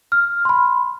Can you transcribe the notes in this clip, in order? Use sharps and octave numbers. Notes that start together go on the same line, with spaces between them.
F6
B5 C6